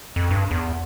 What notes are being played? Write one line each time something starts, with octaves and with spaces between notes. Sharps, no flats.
F2
G2
E2